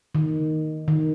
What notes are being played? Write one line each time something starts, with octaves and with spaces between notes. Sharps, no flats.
D#3
D#3